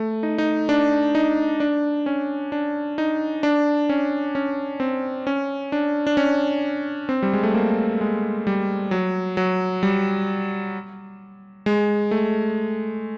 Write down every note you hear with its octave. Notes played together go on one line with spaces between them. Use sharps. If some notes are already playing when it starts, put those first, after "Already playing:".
Already playing: A3
D#4
D#4
D4
D#4
D4
C#4
D4
D#4
D4
C#4
C#4
C4
C#4
D4
D4
C#4
C4
G3
G#3
A3
A#3
G#3
G3
F#3
F#3
G3
G#3
A3